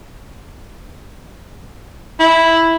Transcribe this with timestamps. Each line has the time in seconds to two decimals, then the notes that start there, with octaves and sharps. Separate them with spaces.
2.20 E4